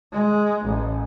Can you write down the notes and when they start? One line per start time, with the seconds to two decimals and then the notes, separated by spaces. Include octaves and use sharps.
0.13 G#3
0.66 A1